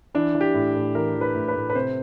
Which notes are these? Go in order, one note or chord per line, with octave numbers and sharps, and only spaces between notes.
E3 D4
E3
G4
A2
A2
E3 A#4
E3
B4
A2
B4
A2
B4
C3 C5